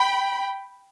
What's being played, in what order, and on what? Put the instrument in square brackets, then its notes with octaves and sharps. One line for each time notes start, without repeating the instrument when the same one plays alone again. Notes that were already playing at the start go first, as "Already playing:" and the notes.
Already playing: [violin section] G5 B5